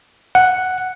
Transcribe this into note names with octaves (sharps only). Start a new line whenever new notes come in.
F#5